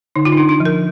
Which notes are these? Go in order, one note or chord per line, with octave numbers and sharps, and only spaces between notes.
D3 D#4
F4
D#4
D4
D4
F3
A#4